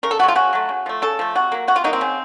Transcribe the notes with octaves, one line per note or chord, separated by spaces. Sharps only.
C#3 A#4
A4
F#3 A3 F#4
F4
C#3 F#4
F#3 A3
C#3
F3 A3
C#3 A4
F3 A3
C3 F#4
F#3 A#3
C3 F#4
F4
F#3 A#3 D#4
C4
C#3